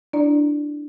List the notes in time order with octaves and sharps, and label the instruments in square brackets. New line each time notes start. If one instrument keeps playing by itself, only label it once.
[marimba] D4 E4 D5 A#5